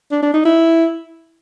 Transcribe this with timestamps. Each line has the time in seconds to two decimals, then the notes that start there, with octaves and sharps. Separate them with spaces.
0.11 D4
0.22 D4
0.34 D#4
0.45 E4